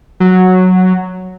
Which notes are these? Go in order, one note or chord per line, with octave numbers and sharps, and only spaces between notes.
F#3